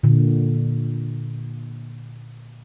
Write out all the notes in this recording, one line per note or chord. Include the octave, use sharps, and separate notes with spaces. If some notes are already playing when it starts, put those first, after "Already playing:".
A#2 D3